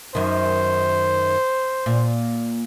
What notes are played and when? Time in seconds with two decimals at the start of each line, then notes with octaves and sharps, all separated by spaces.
0.15 F#2 D#3 C5
1.86 A#2